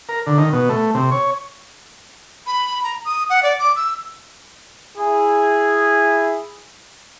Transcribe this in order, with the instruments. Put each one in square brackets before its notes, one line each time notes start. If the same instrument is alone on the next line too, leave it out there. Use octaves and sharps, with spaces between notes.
[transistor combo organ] A#4
D3
D#3
B2
A3
C3
C#5
[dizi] B5
A#5
D#6
F#5
D5
D6
E6
[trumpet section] E4 G#4